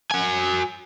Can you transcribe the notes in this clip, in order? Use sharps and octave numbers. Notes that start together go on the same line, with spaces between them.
F#4 G#5